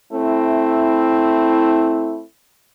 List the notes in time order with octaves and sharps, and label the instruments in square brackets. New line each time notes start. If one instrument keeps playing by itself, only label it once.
[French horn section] A3 C4 E4